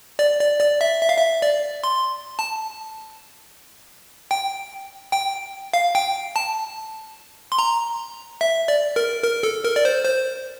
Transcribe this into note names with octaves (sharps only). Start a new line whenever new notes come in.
D5
D5
D5
E5
E5
F5
E5
D5
C6
A5
G5
G5
F5
G5
A5
C6
A#5
E5
D5
A#4
A#4
A4
A#4
D5
C5
C5